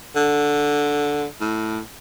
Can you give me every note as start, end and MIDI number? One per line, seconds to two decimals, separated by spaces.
0.16 1.25 50
1.41 1.81 45